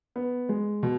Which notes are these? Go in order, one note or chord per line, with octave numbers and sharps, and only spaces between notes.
B3
G#3
B2